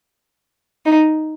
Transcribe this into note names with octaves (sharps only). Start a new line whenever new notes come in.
D#4